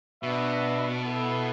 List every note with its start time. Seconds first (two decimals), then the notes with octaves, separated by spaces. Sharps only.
0.23 B2 D4 F#4 B4 E5
1.04 B3 E4 A4